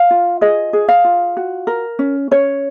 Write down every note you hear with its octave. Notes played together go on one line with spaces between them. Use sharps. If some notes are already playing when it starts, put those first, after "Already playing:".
Already playing: F5
F4
G#4 D#5
G#4
F5
F4
F#4
A#4
C#4
C#4 C#5